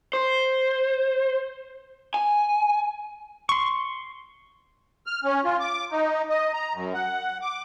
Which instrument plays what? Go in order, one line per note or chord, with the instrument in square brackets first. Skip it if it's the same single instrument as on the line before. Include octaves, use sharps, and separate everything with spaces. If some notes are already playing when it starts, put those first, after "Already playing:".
[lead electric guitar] C5
G#5
[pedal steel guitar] C6 C#6
[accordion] F6
C#4
F4
D6
D#4
D#5
A#5
F#2
F#5
D6